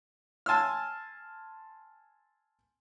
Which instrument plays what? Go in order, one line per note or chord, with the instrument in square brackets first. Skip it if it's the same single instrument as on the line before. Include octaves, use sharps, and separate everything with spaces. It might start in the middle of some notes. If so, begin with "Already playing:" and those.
[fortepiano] G#5 A5 C6 E6 F6